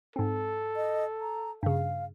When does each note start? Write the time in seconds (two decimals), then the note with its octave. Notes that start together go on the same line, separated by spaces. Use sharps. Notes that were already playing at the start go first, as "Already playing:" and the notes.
0.16 G#2 C4 A4
0.76 D#5
1.21 A#5
1.63 G2 C#3 F5